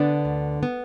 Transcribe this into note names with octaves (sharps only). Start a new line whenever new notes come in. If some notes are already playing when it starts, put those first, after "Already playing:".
Already playing: D3 B3 D4
D2
B3